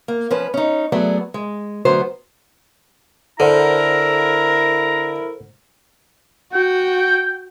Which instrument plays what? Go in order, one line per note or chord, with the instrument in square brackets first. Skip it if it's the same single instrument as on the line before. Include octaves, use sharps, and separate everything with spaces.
[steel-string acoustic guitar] A#3
F3 C#4 B4
C#4 D#4
F#3 A3 B3 G#4 D5
G#3
D2 F#3 B3 C5
[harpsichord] D3 [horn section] E4 A#4 [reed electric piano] A4 C5 F#5 [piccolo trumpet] A#5
[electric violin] F#4 [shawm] G5